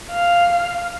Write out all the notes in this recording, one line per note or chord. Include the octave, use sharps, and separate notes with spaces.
F5